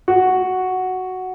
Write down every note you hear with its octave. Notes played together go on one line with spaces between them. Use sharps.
F#4